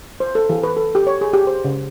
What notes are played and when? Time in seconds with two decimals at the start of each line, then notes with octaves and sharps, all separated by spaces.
0.20 C5
0.35 A4
0.50 E3
0.64 B4
0.77 A4
0.95 G4
1.07 C#5
1.21 G#4
1.33 G4
1.47 C5
1.65 C#3